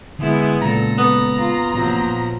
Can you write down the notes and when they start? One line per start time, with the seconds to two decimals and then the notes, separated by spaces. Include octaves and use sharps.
0.19 D3 G#3 B3 E4
0.62 A#2 C#3 G#3 C#4 A4 A#5
0.98 B3
1.38 F4
1.74 A1 F#2 C3 F3 F#3 A#3
2.06 A#2